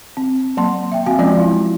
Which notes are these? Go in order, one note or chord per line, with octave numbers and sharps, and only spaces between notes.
C4
F#3 A#3 A5 C6
E5 G5
C4 F#4 F5 G#5
F3 G#3 C#4 F4 D5 D#5
E4